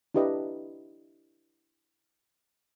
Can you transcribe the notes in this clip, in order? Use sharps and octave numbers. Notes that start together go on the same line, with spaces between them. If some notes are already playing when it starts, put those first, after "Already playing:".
D4 E4 G4 B4 D#5